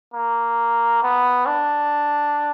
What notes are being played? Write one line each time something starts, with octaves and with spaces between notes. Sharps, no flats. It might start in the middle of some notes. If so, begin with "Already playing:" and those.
A#3
B3
D4